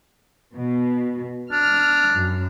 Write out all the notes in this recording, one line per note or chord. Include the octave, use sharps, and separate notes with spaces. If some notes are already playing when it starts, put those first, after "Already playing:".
B2
D4 F6
F#2